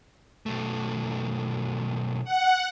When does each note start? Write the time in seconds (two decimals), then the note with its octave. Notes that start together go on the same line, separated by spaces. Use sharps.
0.46 B1 A3
2.24 F#5